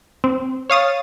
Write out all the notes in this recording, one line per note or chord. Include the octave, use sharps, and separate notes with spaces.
C4
C#5 F5 D#6 A6